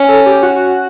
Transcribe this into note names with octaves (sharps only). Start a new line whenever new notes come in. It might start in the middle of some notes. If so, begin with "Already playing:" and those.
Already playing: C#4
A4
G4
F#4